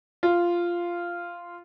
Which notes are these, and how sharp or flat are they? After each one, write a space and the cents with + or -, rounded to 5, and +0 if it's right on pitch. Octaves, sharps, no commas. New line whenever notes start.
F4 -10